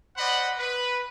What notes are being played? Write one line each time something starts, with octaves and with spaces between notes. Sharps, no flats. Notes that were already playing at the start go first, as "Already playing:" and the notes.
C5 D5 D#5 F#5 B5
B4